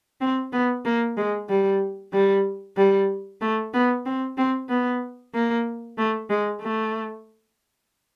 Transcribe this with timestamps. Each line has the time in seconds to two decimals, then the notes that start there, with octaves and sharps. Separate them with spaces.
0.21 C4
0.52 B3
0.85 A#3
1.17 G#3
1.49 G3
2.13 G3
2.77 G3
3.41 A3
3.73 B3
4.06 C4
4.37 C4
4.69 B3
5.34 A#3
5.98 A3
6.30 G#3
6.61 A3